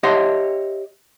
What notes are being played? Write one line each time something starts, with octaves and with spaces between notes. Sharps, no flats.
G4 C#5 D#5 E5 F#5 C6